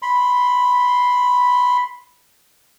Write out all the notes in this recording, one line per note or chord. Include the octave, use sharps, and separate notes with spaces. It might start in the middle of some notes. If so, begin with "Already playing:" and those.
B5 C6